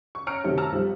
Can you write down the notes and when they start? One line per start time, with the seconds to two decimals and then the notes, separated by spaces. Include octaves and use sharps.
0.15 C#6
0.27 C#4 A#5 F6 C#7 D7
0.44 F#1 C3 D#3 F#3 A3 C#4
0.58 A5 A#5 E6 F6
0.72 B1 F3 G3